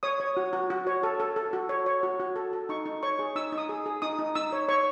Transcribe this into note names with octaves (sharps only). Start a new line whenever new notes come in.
C#5 D#6
C#5
F#4
F#4
F#4
C#5
A4
A4
A4
F#4
C#5
C#5
F#4
F#4
A4
A4
D#4 C#6
D#4
C#5 C#6
G#4
D#4 E6
D#4
D#6
G#4
G#4
D#4 D#6
D#4
D#4 E6
C#5
C#5 C#6